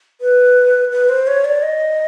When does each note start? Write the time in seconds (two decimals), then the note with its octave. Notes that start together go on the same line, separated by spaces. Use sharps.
0.21 B4
0.92 B4
1.09 C5
1.27 C#5
1.45 D5
1.62 D#5